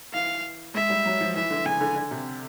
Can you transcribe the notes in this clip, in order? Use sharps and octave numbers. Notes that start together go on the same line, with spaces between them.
E3 F5
G#3 E5
G3
F#3
F3
E3 E5
D3
C#3 G#5
D3
D3
C3